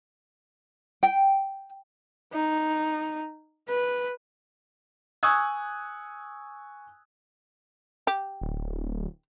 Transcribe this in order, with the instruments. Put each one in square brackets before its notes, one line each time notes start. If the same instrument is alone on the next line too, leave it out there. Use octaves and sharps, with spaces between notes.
[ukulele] G5
[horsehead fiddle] D#4
B4
[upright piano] G#5 C#6 D#6 E6 F#6 G#6
[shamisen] G4
[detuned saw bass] D1